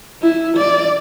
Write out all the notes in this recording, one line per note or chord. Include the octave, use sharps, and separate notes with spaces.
E4
D5